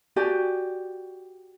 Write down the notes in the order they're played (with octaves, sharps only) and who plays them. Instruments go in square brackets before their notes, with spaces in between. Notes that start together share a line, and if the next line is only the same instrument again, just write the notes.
[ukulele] F#4 G4 D5 G#5